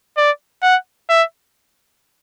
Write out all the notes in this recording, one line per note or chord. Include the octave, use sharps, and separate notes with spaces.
D5
F#5
E5